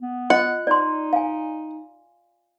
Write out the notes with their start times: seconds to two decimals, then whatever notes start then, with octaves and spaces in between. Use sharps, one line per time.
0.01 B3
0.30 F4 D#5 F#5
0.67 D#4 D5 C6
1.13 F5 G#5